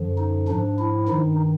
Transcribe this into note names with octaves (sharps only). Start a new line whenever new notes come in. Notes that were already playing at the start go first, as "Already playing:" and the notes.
Already playing: F#2 D3 F3
D#4
G#2 F3 D4
E4
G2 D#3 D#4